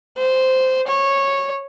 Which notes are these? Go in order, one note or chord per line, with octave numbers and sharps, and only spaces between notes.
C5
C#5